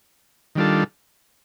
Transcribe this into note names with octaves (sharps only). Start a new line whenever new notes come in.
D#3 G3 D4 F4 A4